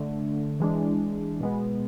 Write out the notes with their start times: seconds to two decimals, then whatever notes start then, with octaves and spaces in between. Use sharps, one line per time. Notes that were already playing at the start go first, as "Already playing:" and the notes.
Already playing: D3 A3
0.60 E3 G#3 D4
1.40 B2 G#3 B3